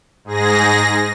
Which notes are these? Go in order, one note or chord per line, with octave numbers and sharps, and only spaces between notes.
G#2 G#4 A#6